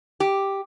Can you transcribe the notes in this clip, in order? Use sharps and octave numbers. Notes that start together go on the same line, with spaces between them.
G4